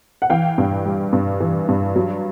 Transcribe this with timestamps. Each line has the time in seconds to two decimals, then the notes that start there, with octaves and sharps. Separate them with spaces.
0.22 F#5
0.30 E3 F5 G5
0.58 G2
0.85 G3
1.13 G2
1.40 E3
1.68 G2
1.96 F#3